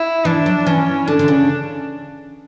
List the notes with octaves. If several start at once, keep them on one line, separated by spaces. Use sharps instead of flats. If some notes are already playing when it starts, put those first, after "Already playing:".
Already playing: E4
E3 D4
F#3
E3 C#4
D3 D4
D3
C#3